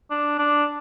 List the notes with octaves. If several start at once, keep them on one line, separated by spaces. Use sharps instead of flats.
D4
D4